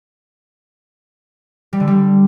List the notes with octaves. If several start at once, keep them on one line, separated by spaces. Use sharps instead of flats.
G3
D3
G3